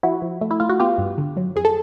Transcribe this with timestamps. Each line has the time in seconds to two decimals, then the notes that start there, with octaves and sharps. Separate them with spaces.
0.03 F3 E4 F#4
0.22 F3
0.41 A3
0.51 E4
0.60 A3 F4
0.70 F#4
0.80 B3 F4 G4
0.98 G2
1.18 D3
1.37 F#3
1.56 F2 G#4
1.65 A4